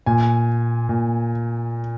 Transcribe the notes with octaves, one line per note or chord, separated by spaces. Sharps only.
A#2 G#5
A#2